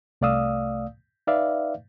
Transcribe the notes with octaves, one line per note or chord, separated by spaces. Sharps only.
C2 A3 D5 F5 D#6 E6
D#4 B4 D5 E5 F5